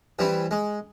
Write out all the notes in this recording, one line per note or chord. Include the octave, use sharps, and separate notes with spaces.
E3 G3 C4 E4
G#3